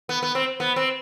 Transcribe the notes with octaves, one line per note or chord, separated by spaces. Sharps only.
B3
B3
C4
B3
C4